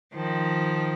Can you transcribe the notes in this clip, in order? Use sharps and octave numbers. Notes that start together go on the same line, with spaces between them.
D#3 F3